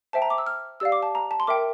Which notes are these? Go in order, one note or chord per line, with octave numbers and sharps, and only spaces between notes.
C5 E5 G5 A5
A#5
D6
E6
F6
G4 D5 F5 E6
D6
A5
A#5
A5
C6
A#4 E5 G5 D6